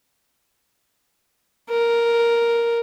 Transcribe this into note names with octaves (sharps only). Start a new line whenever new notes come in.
A#4